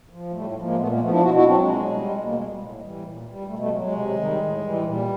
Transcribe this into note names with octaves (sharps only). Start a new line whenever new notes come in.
F3
A2 G3 A3
F3
G#3 A#3
A#2 A3 B3
G#3 A#3
F3 A3 B3
D4 E4
B2 E4 F#4
E4 F#4
F#3 C4 D4
G#3
B2
G3
B2 G#3
G#3 A#3
G3 G#3
G3
A2
E3 G3
A#2
G3
B2 G3 A3
G3 A3
F#3 G#3
G#3
C3
D#3 G3
A2
E3 G3
A#2 G3